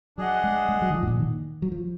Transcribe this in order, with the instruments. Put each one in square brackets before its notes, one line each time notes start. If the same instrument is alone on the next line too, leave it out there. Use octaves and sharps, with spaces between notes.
[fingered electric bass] F#3 [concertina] D4 G#4 D#5 F#5
[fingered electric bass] G#3
G#3
F#3
D#3
F3
G#2
A#2
D#3
F#3
F3